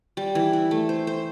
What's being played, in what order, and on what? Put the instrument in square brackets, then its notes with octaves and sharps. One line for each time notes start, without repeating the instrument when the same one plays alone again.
[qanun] G3
E3
E4
A3
C5
C5